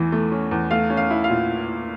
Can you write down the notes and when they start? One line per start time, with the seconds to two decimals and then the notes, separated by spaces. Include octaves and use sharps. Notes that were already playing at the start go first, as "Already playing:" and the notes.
Already playing: E2 E3 A3
0.12 A3
0.32 C#4
0.51 E2
0.71 A3 F5
0.90 C#4
0.97 F5
1.10 E4
1.24 F5
1.30 A#2